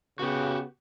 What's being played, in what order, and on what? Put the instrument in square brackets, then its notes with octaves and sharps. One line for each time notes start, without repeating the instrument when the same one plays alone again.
[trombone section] C#3 B3 [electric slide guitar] F#4 G4